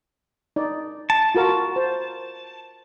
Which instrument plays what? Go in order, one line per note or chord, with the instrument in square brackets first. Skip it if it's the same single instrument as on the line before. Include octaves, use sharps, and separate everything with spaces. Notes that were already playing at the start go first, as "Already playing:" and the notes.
[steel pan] D#4 D5
[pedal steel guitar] A5
[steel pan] F4 F#4 A#4
C5